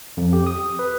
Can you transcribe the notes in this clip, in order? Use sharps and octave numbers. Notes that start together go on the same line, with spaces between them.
F2
G4
D#6
B4